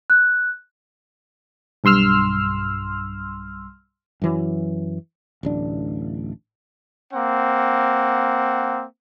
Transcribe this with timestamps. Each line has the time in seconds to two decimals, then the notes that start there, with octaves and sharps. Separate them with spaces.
0.10 F#6
1.84 B1 G2 C6 E6 F6
4.22 F#2 E3 F#3
5.43 D1 A1 D4
7.13 A#3 C4 F#5